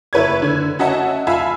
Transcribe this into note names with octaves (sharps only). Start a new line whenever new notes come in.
F#1 E4 B4 C#5 G#6
D3 G#6
C#4 F#4 D#5 E5 F#5 A5
F4 E5 F5 G#5 A5 B5